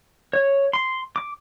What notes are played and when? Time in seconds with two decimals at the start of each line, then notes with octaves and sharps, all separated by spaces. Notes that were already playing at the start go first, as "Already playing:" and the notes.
0.33 C#5
0.73 C6
1.16 D6